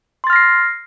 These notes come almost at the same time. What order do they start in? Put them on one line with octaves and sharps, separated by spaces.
C6 A6 F6 A#6 C7